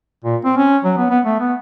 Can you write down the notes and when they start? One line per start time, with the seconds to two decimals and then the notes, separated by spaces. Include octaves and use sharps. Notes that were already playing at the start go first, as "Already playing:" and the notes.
0.24 A#2
0.44 C4
0.57 C#4
0.84 F#3
0.97 B3
1.10 B3
1.25 A3
1.40 B3